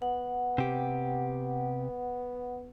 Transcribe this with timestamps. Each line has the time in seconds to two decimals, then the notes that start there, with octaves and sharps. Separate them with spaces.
0.02 B3 F#5
0.58 C3 G4